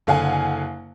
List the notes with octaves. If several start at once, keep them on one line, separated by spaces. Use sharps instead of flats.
F#1 D3 F5 F#5 G#5